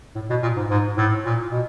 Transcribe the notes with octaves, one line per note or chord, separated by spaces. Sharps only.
A2
B2
A#2
G#2
G#2
A2
A#2
B2